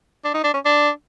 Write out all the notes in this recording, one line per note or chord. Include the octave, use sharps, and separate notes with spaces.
D4
D#4
D4
C#4
D4